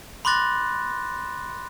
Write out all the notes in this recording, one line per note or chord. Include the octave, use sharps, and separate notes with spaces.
B5 C6 D6 F#6 A6 A#6